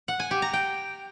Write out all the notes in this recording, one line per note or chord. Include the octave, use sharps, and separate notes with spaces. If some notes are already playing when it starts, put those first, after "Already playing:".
F#5
G#5
G4
A#5
G5